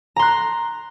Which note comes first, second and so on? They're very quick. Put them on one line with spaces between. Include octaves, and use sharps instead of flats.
A#5 C6 F#6